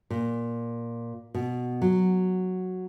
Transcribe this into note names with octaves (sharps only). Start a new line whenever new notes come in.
A#2
B2
F#3